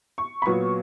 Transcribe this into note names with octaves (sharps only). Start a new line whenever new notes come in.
C#6
B5
A#2 F#3 B3 C#6